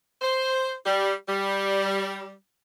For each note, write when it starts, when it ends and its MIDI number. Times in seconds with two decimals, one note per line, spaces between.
0.21 0.72 72
0.86 1.13 55
1.29 2.33 55